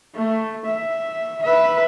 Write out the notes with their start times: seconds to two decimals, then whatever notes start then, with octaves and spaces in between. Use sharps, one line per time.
0.15 A3
0.66 E5
1.43 B4 E5